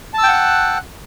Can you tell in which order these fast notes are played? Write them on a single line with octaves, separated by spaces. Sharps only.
A5 E6 G5 F#5 F#6